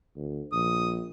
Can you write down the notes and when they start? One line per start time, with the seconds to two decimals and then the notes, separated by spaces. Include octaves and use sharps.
0.16 D2
0.52 A#1 D#6